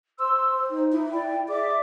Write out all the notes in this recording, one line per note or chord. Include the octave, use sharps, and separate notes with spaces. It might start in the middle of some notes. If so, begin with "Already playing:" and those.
C5 C6 E6
D#4
E4
D5 G5
G#4 D5 E5 D6